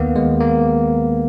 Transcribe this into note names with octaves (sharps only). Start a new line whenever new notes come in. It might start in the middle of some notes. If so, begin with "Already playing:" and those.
Already playing: D#2 D#3 A#3 B3
G#3
A#3